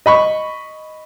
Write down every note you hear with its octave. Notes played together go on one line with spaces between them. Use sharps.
D#5 B5 C#6